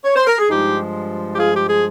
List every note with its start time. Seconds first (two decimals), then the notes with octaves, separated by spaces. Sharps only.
0.04 C#5
0.15 C5
0.27 A#4
0.38 G#4
0.50 G2 F3 G#3 D#4 G4
1.33 G4
1.38 F4 G#4
1.55 G4
1.69 G#4